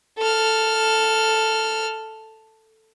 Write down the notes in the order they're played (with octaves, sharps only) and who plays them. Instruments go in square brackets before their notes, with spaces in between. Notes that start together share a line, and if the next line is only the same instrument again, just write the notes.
[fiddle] A4 F6